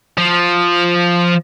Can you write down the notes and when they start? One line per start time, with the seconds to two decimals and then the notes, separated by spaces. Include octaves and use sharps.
0.18 F3